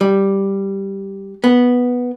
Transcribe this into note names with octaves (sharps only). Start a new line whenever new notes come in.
G3
B3